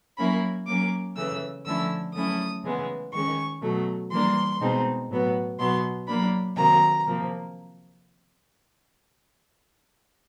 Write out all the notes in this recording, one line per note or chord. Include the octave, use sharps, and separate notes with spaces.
F#3 A#3 C#4 E4 B5
F#3 A#3 C#4 D6
C#3 E3 A3 E6
D3 F3 A3 C#4 E4 E6
F#3 A3 C#4 E4 D#6
C#3 E3 G#3 B3
D#3 G#3 C#4 C#6
B2 F#3 A3
E3 G3 A#3 D4 C6
B2 G#3 C4 D#4
A2 F#3 B3
B2 F#3 B3 C6
F#3 A#3 D4 B5
C3 D#3 F#3 A#3 A#5
C3 F3 A#3